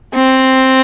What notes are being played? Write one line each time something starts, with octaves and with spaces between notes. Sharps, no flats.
C4